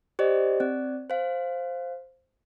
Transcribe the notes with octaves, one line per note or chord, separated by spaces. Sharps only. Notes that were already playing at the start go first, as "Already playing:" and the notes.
G4 C5 D5 D#5
C4 D5
C5 F5